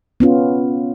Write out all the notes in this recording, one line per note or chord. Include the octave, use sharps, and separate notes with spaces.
B3 C#4 F4